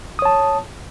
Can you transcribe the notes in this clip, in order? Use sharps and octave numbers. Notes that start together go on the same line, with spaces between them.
C#5 A5 D#6